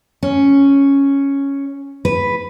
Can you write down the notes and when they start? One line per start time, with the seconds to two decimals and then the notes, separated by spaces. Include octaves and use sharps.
0.23 C#4
2.05 B4